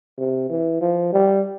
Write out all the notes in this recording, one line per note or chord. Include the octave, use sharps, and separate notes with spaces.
C3
E3
F3
G3